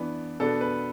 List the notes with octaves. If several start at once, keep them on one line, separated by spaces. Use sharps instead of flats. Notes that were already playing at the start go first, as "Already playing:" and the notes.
Already playing: E3 B3 D4
B2 B3 D4 A4
B4